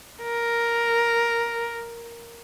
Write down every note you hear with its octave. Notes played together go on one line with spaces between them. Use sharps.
A#4